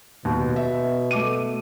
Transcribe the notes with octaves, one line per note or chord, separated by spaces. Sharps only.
D#2 B2
E5
A3 D6 D#7